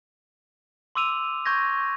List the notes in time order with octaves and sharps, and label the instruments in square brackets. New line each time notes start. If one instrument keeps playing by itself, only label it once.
[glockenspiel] C6 D6 E6 D#7 F7
C#6 G6 G#6 A#6